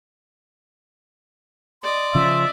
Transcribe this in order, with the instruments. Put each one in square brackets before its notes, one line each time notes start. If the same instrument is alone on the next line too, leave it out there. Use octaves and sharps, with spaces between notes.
[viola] D5 D#5 [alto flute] C6
[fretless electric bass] C#3 F3 [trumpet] E5